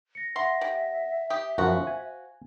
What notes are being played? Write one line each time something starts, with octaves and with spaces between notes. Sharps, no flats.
A#6 C#7
E5 F#5 C6 A#6
C3
G4 D#6
F#2 F3 F#4 C5 F5
G#5